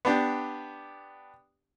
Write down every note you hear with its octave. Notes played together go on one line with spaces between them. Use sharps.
B3 D4 G4